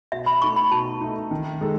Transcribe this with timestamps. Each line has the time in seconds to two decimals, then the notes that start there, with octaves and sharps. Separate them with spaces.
0.12 B2 E5
0.26 B5
0.42 A3 D#4 C#6
0.56 B5
0.71 B2 A5
1.01 A3 D#4
1.31 D#3
1.61 G#3 D#4 A4